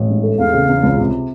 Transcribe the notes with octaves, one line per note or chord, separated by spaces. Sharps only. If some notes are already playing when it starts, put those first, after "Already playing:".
Already playing: A1
G#2
A3
E2 F5
C#3
E2
C#2
C3